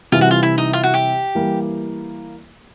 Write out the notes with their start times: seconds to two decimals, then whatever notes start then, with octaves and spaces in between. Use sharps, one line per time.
0.12 C3 E3 G3 F4
0.21 F#4
0.31 F4
0.43 E4
0.58 D#4
0.73 F4
0.83 F#4
0.94 G4
1.35 E3 G3 A#3